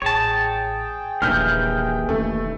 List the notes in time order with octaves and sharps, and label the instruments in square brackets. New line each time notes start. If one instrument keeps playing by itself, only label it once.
[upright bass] A1 [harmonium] G#4 G5 [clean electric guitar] C#5 A5
[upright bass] D#1 A#1 [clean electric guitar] D#2 E3 [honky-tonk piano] F6 G6
[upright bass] E1 E2 [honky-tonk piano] A3